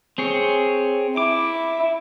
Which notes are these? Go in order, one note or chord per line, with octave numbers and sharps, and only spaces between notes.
C4 G#4 C#5
E4 D6